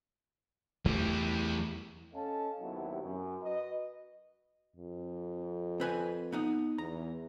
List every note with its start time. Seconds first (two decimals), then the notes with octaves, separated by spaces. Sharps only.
0.85 E2 G3 A3 E4
2.14 C#4 A4 D#5 F5 A5
2.61 D#2 C3 F#3 B3 E4
3.03 F#2
3.42 F#4 B4 D#5
4.76 F2
5.80 C4 B4 G#5
6.32 B3 D#4 F#5
6.78 E2 A#5